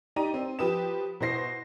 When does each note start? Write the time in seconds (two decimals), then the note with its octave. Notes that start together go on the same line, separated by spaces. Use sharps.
0.16 D#4 G4 D5 A#5 D#7
0.34 C4
0.59 F3 G4 B4 D#6 E7
1.20 B2 E4 C5 A#6 C7